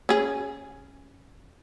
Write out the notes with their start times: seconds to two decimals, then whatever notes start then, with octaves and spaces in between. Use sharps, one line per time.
0.09 C#4 G#4